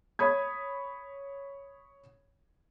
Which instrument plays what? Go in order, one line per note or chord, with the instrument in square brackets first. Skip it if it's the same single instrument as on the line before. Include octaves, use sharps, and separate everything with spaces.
[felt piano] C#5 B5 D#6 G#6